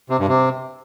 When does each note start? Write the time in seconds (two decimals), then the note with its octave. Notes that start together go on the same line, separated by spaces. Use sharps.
0.10 C3
0.19 G2
0.29 C3